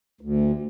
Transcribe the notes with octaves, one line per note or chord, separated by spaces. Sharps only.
D2